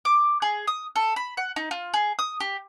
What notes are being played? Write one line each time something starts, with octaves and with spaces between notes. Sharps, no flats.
D6
G#4
D#6
A4
B5
F#5
D#4
F4
G#4
D#6
G4